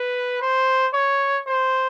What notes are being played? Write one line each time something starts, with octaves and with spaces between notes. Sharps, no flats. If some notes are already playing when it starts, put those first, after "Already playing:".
Already playing: B4
C5
C#5
C5